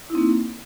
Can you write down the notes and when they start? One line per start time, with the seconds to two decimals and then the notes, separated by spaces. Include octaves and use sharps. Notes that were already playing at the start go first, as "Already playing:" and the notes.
0.10 E4
0.12 D#4
0.15 C4
0.18 A#3